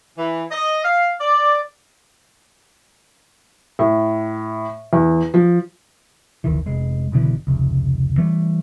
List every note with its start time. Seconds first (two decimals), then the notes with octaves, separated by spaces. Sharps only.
0.18 E3
0.51 D#5
0.84 F5
1.20 D5
3.79 A2
4.93 E2
5.34 F3
6.44 F#1 D2 D#3 E3
6.66 F1 G#3
7.12 F#1 B2 D3 E3
7.47 F1 C#2
8.18 E3 G3 A3